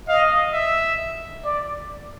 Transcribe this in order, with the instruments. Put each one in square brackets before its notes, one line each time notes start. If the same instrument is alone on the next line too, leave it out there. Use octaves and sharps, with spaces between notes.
[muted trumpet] D#5 [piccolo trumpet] F5
[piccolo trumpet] E5
[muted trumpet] D5